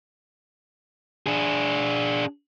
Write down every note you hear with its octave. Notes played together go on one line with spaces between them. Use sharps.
D4 G#4